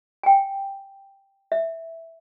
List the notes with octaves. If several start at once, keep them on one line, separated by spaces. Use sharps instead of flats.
G5 G#5
E5